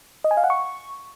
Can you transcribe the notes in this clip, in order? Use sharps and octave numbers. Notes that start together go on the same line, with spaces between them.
D#5
G#5
F5
F#5
C#6